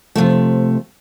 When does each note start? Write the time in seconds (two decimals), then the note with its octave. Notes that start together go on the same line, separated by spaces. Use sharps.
0.15 C3 E3 F3 A3